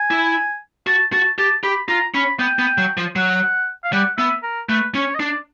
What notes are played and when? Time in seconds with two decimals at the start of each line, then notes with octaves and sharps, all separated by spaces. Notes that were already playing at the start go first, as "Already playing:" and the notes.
Already playing: G#5
0.11 E4
0.87 F#4 A5
1.13 F#4 A5
1.38 G4 A5
1.64 G4 B5
1.88 F4 A#5
2.14 C#4 B5
2.39 B3 G5
2.59 B3
2.78 F#3
2.97 F3
3.16 F#3 F#5
3.84 F5
3.93 G3 F#5
4.18 B3 E5
4.43 A#4
4.69 A3 B4
4.95 C#4 C#5
5.15 D#5
5.20 D4 D5